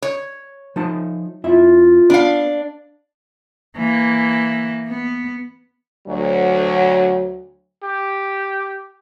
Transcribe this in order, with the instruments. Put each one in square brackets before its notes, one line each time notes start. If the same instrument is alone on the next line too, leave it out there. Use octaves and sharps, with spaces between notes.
[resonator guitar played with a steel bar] C#5
[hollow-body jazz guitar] F3 D#4 A5
[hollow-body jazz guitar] F2 E4 E5 [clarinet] F4
[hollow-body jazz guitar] B3 [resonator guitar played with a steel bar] D4 F5
[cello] E3 A#3
B3
[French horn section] D2 F#3
[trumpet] G4